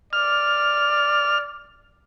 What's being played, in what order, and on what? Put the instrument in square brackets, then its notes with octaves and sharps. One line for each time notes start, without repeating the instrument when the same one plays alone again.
[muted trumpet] D5 [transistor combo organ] F6